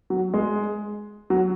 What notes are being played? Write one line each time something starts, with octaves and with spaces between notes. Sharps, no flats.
F#3
G#3
F#3